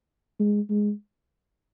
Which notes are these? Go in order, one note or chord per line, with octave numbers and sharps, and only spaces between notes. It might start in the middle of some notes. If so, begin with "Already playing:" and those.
G#3
G#3